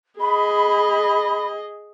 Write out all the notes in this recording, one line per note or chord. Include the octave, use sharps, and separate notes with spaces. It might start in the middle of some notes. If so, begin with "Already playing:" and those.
G#4 D#5 B5